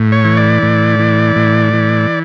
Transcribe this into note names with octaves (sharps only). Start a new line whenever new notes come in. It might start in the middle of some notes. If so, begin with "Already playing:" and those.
Already playing: A2
C#5
E3
D5
A2
E3
A2
E3